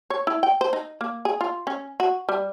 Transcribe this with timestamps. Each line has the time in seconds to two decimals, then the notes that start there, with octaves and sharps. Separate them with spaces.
0.10 C#5
0.27 E4
0.43 G5
0.61 C5
0.73 D#4
1.01 A#3
1.25 G#4
1.41 F4
1.67 C#4
2.00 F#4
2.29 G3